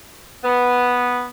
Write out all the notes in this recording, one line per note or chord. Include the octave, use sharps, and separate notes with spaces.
B3